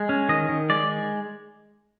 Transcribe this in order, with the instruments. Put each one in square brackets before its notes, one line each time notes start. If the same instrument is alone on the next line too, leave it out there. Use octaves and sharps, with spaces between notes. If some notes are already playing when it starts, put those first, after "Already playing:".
Already playing: [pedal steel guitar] G#3
C#4
D#3 D#5
D#3
G#3 D5